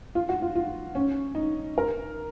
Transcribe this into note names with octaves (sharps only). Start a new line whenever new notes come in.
F4
F#4
F4
F4
C#4
D#4
A#4